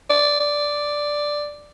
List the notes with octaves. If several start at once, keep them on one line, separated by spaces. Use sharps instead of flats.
D5
D5